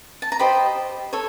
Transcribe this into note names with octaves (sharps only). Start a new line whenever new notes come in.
A5
A#5
G4 C5 D#5 B5
A4 C#5